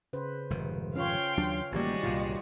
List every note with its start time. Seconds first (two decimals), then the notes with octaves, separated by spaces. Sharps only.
0.13 C#3 B4 C5
0.50 F1 G#2 D#3
0.95 C#4 F4 C#5 F5 G5 C6
1.37 D#2 F#3 D4
1.72 A1 D#3 G3 G#3 A#3 F#4 G4 D5
2.03 C2 G2 A#2 F4